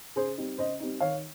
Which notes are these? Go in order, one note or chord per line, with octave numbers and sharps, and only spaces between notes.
C#3 G#4 C5
G3 C4 D#4
C#3 C5 D#5
G3 C4 D#4
D#3 C#5 F5